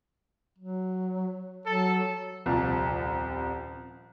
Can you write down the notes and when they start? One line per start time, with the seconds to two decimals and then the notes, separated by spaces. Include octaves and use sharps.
0.58 F#3
1.66 F#3 A4
2.46 D#1 C2 F3 A5